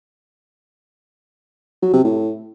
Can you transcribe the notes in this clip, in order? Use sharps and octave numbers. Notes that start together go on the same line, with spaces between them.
F#3
C3
A2